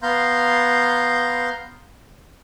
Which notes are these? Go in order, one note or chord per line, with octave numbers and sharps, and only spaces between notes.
B3 F5 A#5 C6 G6